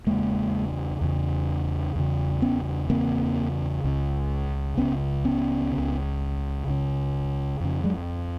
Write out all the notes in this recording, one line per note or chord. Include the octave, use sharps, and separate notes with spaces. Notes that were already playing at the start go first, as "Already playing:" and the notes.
E2 C#3 G#3 A#3
E2 C#3
E2 C#3
B3 C#4
E2 C#3 A#3 C4
C#2 C#3
C#2 C#3 B3 C#4
B3 C#4
C#2 C#3
C#2 C#3
F2 C#3
F#3 G#3